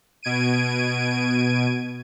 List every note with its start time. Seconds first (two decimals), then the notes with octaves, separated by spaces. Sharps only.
0.23 B2 G#6 D7 D#7